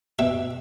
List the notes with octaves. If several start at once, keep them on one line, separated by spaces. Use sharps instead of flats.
B2 E5